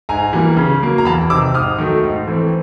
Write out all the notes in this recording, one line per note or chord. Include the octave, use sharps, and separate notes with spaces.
G#2 G#5 A#5
E3 G3 A#3
C#3
F#3 A#3
A#5
E2 A5 B5
C3 D#3 D6 E6
G#2 D#6 F6
D#3 F#3 A3
G#2
E3 A3 C4